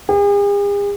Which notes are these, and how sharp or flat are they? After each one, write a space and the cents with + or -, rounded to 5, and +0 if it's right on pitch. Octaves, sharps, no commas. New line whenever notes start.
G#4 -45